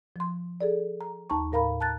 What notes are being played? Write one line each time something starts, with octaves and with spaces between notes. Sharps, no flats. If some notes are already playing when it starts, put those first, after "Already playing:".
F3 C6
G#4 A4 D5
A#5
D#2 D#4 A5 A#5 C#6
A2 A#4 F5 A#5 B5
A5 A#5 F#6 A6